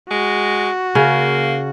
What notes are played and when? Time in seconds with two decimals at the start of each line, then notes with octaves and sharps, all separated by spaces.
0.11 G#3 F#4
0.95 C#3 A#3